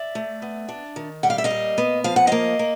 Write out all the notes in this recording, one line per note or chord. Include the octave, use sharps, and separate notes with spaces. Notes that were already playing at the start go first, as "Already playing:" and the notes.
Already playing: D5 E5
A3
B3
D4
D#3
G3 F#5
F5
E5
D#5 F5
A#2
B3
F3 F5
F#5
A#3 D#5 F5
A#3